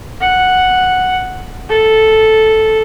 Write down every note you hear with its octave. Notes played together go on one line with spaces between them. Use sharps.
F#5
A4